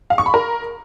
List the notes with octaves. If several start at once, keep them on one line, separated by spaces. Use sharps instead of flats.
F5
C#6
B5
A#4